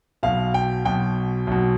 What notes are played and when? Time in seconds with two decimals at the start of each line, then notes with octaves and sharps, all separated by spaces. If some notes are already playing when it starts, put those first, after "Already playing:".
0.23 B1 B2 F5
0.54 G5
0.85 B1 B2 G5
1.47 B1 B2